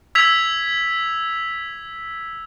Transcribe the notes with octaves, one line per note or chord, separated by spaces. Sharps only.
E6 G#6 B6 F7